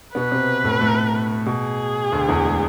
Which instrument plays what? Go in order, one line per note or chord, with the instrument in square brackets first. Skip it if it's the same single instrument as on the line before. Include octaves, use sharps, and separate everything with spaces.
[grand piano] B2 B3 [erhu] B4
[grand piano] C3 C4
A2 A3
A2 A3
[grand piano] B2 [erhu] G#4
[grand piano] D2 D3
E2 E3
G#3